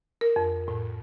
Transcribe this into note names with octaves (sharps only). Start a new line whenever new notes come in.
A#4
F2
A2